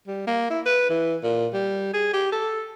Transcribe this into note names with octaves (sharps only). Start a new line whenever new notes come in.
G3
A#3
E4
B4
E3
A#2
G3
G#4
G4
A4